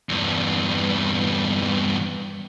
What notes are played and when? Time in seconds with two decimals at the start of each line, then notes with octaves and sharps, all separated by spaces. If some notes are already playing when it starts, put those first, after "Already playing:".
0.09 E2 G2